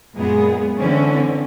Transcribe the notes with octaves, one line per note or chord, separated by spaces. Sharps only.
F#2 A#2 G#3 B3 G#4
D3 E3 C4 C#4